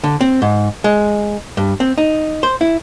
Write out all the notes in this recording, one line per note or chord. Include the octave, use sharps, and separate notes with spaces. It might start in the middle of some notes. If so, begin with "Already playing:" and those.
D3
C4
G#2
G#3
G2
C4
D#4
C5
E4